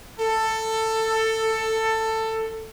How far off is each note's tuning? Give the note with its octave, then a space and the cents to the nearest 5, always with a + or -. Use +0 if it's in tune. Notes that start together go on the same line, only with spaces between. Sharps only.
A4 +15